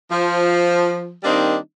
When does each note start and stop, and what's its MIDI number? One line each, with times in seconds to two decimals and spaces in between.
0.10 1.13 53
1.24 1.55 51
1.24 1.55 55
1.24 1.55 58
1.24 1.55 60
1.24 1.55 62
1.24 1.55 63